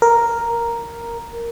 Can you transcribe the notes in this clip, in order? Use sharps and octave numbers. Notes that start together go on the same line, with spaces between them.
A#4